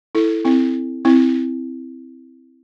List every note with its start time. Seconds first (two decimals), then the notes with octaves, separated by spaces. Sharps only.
0.15 E4 A4
0.45 C4 E4
1.05 C4 E4